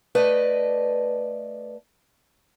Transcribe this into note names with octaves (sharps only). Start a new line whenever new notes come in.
A3 B4 D5 D#5